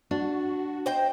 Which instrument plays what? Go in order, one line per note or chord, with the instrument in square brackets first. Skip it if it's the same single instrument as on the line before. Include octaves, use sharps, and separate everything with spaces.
[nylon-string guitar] D4 [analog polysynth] F#4
[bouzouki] C5 D#5 G5